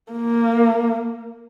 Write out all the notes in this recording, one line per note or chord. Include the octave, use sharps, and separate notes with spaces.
A#3